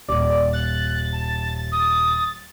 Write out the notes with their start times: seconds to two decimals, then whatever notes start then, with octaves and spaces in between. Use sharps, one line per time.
0.08 D#1 D5
0.53 F#6 A6
1.12 A5
1.72 D#6